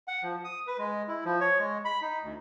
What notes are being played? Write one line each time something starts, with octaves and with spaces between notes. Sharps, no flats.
F#5
F3
D#6
B4
G#3
E4
F3
C#5
G#3
B5
D#4
D2